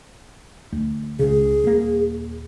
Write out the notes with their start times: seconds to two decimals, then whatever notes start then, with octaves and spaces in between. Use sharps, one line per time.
0.72 D2
1.19 C#2 C#3 G#4
1.64 D#1 A#3